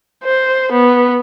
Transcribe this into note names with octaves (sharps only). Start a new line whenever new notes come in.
C5
B3